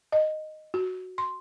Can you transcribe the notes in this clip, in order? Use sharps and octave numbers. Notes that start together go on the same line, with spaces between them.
D#5
F#4
C6